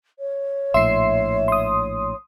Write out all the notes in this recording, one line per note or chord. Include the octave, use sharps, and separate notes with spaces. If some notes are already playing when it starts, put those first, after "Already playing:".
C#5
A#1 A2 E5 C6 C7
C6 D#6